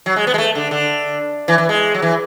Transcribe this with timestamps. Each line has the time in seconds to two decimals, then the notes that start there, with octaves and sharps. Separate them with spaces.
0.06 F#3
0.16 G#3
0.27 B3
0.34 G#3
0.38 A3
0.55 D3
0.71 D3
1.48 E3
1.58 E3
1.69 G#3
1.94 F#3
2.02 E3